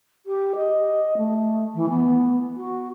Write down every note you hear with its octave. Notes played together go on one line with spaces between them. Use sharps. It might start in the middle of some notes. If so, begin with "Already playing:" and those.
G4
D#5
A3
E3
B3
F#4